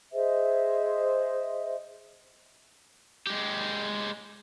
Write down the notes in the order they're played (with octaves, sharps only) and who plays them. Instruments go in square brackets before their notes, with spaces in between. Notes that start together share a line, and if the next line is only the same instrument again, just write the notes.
[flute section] G#4 C5 D#5 E5
[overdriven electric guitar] G#3 G4